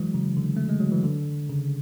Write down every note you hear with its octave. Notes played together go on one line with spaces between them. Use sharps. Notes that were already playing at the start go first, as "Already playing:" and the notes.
Already playing: E3 F#3 G#3
C#3
D3
A3
G#3
F#3
E3
D3
C#3